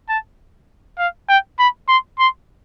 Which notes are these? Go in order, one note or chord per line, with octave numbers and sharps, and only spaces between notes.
A5
F5
G5
B5
C6
C6